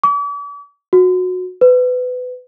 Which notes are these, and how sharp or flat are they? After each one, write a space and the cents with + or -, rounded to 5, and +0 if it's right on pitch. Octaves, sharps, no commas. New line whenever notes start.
D6 -45
F#4 -20
B4 +25